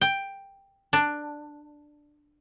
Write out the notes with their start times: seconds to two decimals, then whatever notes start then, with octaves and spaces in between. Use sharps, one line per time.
0.01 G5
0.93 D4